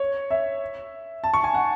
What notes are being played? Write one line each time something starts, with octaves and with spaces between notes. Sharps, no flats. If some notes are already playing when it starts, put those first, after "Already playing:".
Already playing: C#5
E5
A5
C#6
G#5
F#5